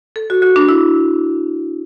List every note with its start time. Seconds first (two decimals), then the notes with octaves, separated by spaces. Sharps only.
0.16 A4
0.30 F#4
0.42 F#4
0.56 D4
0.69 E4